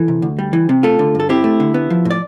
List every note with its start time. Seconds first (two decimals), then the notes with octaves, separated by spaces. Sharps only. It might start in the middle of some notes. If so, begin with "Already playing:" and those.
Already playing: E3 A4
0.08 C3
0.22 D2
0.39 G3
0.53 E3
0.69 C3
0.83 A3 F4 A4
0.99 D3
1.15 G2 A4
1.29 C4 E4 G4
1.44 A3
1.60 D3
1.74 B3
1.90 F3
2.05 A2
2.10 D5